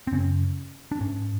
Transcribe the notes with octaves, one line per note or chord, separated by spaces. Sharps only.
C4
F#2 C#3 C#4
D4
G#2 C#4